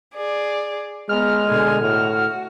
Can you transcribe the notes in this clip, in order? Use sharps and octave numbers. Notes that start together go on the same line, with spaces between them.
G#4 D5
G#3 B3 A#5 F6
B2 D3 G#5
A2 F#4